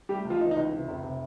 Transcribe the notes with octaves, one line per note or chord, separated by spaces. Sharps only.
G3 A3 G4
C#2
F3 F4
E3 D#4
D#4
C#2
C3
F1
C3